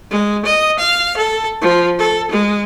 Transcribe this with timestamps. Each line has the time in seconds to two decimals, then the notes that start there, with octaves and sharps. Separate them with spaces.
0.10 G#3
0.45 D#5
0.78 F5
1.17 A4
1.61 F3
1.99 A4
2.31 G#3